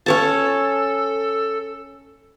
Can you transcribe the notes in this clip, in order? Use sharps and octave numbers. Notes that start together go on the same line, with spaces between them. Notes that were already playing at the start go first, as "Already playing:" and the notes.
C#4 A4 C#5 A5